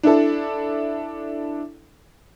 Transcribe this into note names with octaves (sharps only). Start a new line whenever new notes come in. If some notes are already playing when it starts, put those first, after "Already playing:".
D4 E4 A4